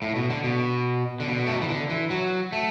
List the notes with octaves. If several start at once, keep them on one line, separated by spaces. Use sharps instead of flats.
A2
B2
D3
B2
D3
B2
A3
F#3
E3
D3
E3
F#3
A3